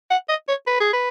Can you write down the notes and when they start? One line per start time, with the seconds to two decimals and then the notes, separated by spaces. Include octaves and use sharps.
0.11 F#5
0.29 D#5
0.48 C#5
0.67 B4
0.80 G#4
0.93 B4